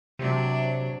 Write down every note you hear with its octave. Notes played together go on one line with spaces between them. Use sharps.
C3 F#3 D4